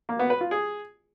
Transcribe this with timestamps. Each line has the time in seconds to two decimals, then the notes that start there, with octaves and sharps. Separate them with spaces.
0.09 A#3
0.19 B3
0.30 B4
0.41 F4
0.51 G#4